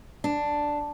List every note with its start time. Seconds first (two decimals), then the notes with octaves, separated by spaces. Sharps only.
0.24 D4